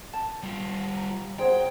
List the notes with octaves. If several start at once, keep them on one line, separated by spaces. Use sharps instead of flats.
A5
G3 F4
A#5
G#4 C5 C#5 F#5 G5